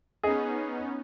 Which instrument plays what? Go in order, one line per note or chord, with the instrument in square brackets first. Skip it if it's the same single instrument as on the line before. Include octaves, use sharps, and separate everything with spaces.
[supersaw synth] B3 C#4 D#4 [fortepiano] G#4 D#5